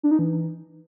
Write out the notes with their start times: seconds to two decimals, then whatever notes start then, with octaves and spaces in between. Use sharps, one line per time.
0.03 D4
0.11 D#4
0.19 E3